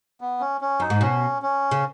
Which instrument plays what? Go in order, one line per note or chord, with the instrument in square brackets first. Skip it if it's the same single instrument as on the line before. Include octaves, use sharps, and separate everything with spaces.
[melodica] B3
C#4
C#4
[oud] F#2 [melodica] D#4
[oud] G#2
[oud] B2 [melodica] C#4
[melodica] C#4
[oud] C#3